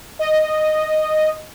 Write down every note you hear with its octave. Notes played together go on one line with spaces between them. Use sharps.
D#5